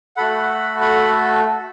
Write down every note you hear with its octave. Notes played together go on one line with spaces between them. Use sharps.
A3 F#4 A4 F#5 B5
F#5 B5